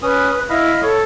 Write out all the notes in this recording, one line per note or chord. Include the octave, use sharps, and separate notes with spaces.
C#4 B4 D#6
E4 D#5 F5 B5
A4 C#5